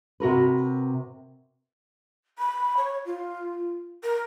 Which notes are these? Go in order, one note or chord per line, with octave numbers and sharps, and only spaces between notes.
C3 F#4 A#4 B4
B5
C#5
F4
A#4